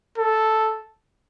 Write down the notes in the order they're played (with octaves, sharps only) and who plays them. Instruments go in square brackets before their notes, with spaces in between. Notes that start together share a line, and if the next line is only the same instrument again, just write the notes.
[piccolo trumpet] A4